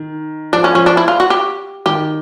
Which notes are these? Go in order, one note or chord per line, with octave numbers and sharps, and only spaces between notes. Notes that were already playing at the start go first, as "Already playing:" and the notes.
Already playing: D#3
F3 D4
C#4
F3 C#4
D4
E4
F4
F#4
G4
D#3 G4